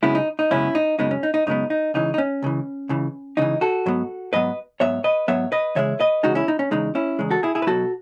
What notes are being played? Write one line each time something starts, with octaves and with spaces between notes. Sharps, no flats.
F#2 C#3 G#3 B3 C#4 E4
D#4
D#4
F#2 C#3 G#3 B3 C#4 E4
D#4
F#2 C#3 G#3 B3 D#4
C#4
D#4
D#4
F#2 C#3 G#3 B3 D#4
D#4
C#2 C#3 E3 D#4
D#4
C#4
C#2 C#3 E3
C#2 C#3 E3
C#2 C#3 E3 D#4
F#4 A4
G#2 F#3 B3
G#2 F#3 B3 B4 D#5
G#2 F#3 B3 C#5 E5
B4 D#5
G#2 F#3 B3 C#5 E5
B4 D#5
E2 C#3 G#3 C#5 E5
B4 D#5
E2 C#3 G#3 D#4 F#4
C#4 E4
D#4
C#4
E2 C#3 G#3 D#4
C#4 E4
E2 C#3 G#3
F#4 A4
E4 G#4
E4 G#4
B4
B1 B2 F#3 F#4 A4